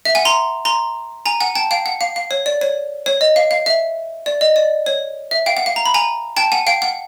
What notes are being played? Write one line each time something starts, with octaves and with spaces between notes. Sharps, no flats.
E5
F#5 G#5
A#5 C6
A#5 C6
G#5 A#5
F#5 G#5
G5 A5
F5 G5
F#5
F5
F5
C#5
D5
C#5
C#5
D#5
F5
F5
E5
D5
D#5
D5
C#5
E5
F5 G5
F#5
F5
A#5
B5
G#5 A#5
G5 A5
F#5 G#5
F5 G5
F#5